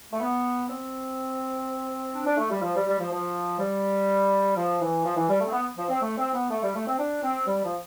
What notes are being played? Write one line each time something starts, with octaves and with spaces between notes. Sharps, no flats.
A3
B3
C4
D4
D4
A3
G3
F3
G3
G3
F3
F3
G3
F3
E3
F3
E3
G3
A3
C4
B3
F3
C4
A3
C4
B3
A3
G3
A3
C4
D4
C4
G3
F3